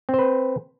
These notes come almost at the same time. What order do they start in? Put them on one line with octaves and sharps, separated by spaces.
C4 C5 B4